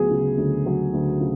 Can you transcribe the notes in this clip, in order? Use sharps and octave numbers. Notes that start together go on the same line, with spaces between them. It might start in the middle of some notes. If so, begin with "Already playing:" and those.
Already playing: D2 F#3 B3 G#4
C#3
D2
F#3
D2
C#3